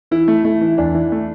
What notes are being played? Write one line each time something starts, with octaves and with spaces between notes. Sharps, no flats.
E3 E4
A3
A3
E3
E2 D4
E3
A3